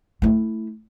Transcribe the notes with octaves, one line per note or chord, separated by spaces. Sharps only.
A3 E4